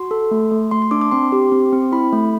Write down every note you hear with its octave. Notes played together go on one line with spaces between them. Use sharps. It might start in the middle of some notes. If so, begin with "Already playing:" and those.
Already playing: F#4 C6
A4
A3
A3
A3 C6
C6
D4 D6
D6
C4 C6
G4
C4
C4
E4 B5
A3